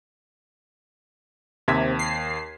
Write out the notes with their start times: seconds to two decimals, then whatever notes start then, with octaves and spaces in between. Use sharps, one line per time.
1.68 D#2 C3 G#6 B6
1.99 C7